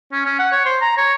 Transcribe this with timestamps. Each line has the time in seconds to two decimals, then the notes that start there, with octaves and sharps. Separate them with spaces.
0.12 C#4
0.26 C#4
0.39 F#5
0.52 C#5
0.65 C5
0.81 A#5
0.97 C#5